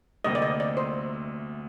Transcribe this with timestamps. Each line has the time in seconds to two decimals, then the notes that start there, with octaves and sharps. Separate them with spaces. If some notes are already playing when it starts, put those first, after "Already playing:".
0.24 D2 C3 G3 A#3 D#5
0.35 D5
0.42 D#5
0.60 D5
0.77 C5